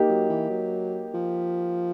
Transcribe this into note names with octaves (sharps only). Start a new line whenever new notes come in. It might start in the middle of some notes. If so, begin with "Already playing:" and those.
Already playing: A#3 D#4 G4
F#3
E3
F#3
F3